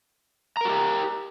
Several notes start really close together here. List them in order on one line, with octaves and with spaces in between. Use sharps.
A#5 A#4 F#4 G4